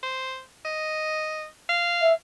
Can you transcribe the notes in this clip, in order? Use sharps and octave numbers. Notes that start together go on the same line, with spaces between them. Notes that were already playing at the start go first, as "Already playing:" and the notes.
C5
D#5
F5
E5